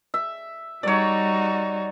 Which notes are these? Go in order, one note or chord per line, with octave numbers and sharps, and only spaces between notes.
E5
G3 D#4 F#4 C#5 D5